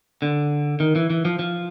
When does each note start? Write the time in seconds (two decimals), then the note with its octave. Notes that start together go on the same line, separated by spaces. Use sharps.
0.22 D3
0.80 D#3
0.96 E3
1.10 E3
1.25 F3
1.39 F3